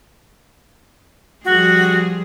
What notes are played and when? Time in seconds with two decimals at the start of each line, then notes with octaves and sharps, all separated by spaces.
1.45 F3 G3 F#4 G#4